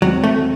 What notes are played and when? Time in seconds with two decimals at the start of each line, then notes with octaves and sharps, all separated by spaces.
0.02 D#2 D#3 F#3 G#3 C4
0.24 A3